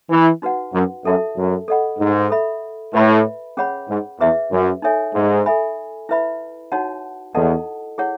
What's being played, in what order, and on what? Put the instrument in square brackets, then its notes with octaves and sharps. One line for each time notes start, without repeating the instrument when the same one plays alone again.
[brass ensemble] E3
[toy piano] D#4 F#4 B4 F#5
[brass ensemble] F#2
[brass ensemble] F#2 [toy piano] A4 E5 A5
[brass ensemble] F#2
[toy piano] A4 D#5 F#5 B5
[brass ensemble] G#2
[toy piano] A4 E5 B5
[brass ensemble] A2 [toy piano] B4 E5 B5
[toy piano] C#4 G#4 C#5 F#5 B5
[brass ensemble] G#2
[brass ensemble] E2 [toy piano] G#4 B4 E5
[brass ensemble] F#2
[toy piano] D#4 A4 C#5 E5 G#5
[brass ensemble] G#2
[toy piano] A4 E5 G#5 B5
E4 B4 E5 B5
D#4 F#4 C#5 F#5 A5
[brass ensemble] E2 [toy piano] E4 A4 D#5 F#5 A5
[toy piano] E4 G#4 C#5 F#5